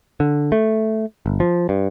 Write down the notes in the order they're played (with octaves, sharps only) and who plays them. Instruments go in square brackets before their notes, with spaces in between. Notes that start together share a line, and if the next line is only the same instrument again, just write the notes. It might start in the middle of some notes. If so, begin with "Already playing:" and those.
[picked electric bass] D3
A3
G1
F3
G2